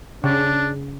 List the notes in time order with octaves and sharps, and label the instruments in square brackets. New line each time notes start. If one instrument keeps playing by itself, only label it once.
[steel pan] C#3 [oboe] D4